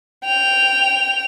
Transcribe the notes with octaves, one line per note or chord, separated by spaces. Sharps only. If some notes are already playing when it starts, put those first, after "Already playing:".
G5 F7